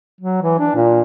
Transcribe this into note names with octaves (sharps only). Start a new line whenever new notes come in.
F#3
E3
D4
A#2